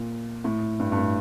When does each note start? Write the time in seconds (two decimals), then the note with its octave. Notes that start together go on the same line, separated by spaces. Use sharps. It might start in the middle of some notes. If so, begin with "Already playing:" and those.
Already playing: A#2
0.44 A2
0.79 G2
0.92 G2
0.97 A2